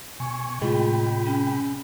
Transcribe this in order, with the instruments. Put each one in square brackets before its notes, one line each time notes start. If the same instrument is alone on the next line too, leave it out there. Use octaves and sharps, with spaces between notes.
[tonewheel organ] B2 G#5 C#6
[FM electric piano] A2 G#3 [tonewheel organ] C3 G5 B5 [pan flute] F4
[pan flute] C#4